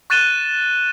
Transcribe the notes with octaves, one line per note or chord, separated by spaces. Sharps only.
C#6 F#6 A6 D#7 E7 G7